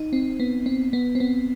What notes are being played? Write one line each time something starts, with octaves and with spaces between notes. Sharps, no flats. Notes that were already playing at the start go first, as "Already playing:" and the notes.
Already playing: D#4
C4
B3
C4
B3
C4
B3